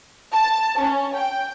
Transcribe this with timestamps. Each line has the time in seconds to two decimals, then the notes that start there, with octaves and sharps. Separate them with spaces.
0.33 A5
0.80 C#4
1.15 G5